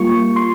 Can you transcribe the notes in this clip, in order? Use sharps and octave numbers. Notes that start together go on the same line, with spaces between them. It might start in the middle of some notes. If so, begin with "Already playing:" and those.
Already playing: G3 A#3 F4 C#6
C6